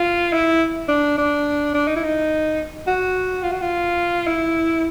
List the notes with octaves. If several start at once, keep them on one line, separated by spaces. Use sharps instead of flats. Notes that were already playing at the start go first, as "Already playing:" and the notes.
Already playing: F4
E4
D4
D4
D4
D#4
E4
D#4
F#4
F4
F#4
F4
E4